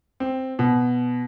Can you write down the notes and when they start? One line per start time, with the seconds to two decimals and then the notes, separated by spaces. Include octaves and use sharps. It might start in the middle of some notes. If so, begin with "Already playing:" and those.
0.20 C4
0.59 B2